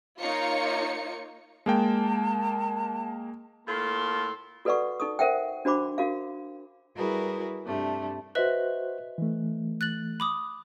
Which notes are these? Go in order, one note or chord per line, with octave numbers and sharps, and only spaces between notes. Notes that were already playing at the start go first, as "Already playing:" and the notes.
A#3 D#4 F4 C#5 C#7
G#3 A#3 G5 A5
A2 A#3 F4 A4 C6
F#4 A4 B4 D5 F#5 C#6
D#4 A4 C#6 D#6
A#4 C5 E5 F#5 G5
D4 F#4 C5 B5 D6
F#4 A#4 F5
G3 E4 F#4 G#4 A#4 B4
G2 C3 A3 D4
F#4 B4 C5 D#5 E5 F#6
E3 A3
F#6 A6 F#7
B5 D6 D#6